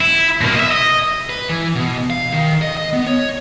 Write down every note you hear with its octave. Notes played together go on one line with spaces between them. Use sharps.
E4
B2 A#3
D#5 E5
D#5
B4
E3
B2
F5
D#3
D#5
D#5
B3
C#5